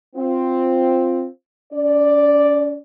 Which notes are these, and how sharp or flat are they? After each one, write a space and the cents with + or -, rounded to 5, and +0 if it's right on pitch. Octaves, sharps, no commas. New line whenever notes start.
C4 +0 F4 +0
C#4 +45 D5 +0